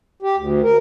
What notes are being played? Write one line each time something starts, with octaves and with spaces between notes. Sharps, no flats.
G4
D2
A#4